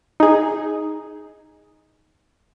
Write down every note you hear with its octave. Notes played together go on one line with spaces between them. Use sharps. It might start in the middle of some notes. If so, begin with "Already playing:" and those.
D#4 G#4